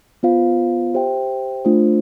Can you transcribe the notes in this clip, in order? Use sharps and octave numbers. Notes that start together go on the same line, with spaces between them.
B3 F4 C5 F5
G4 C5 E5 G5
A3 D4 F4 C5